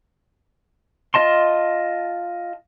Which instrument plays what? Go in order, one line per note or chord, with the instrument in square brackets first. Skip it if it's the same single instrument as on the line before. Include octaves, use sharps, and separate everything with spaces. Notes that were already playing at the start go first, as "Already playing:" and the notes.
[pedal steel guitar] F4 D#5 A5 C6